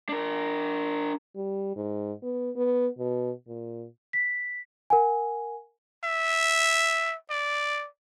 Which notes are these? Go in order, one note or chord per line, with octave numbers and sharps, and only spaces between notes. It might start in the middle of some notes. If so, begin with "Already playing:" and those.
D4 A#4
G3
G#2
B3
B3
B2
A#2
B6
A#4 F#5 G#5
E5
D5